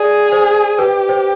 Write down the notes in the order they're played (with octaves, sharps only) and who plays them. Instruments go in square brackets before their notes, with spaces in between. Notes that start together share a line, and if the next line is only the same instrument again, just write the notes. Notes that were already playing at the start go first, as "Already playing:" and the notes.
Already playing: [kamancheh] G#4 [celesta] D5
[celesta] C5
[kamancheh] G4 [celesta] B4
[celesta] C5